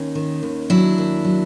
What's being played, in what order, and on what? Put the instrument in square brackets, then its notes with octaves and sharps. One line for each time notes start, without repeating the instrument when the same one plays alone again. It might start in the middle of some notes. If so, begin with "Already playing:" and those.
Already playing: [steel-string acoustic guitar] D#2 C#4 D#4
D#3
D#2
F#3 D4 E4
D#2
F#3